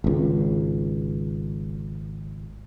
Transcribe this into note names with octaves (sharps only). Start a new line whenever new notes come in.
G#1 C#2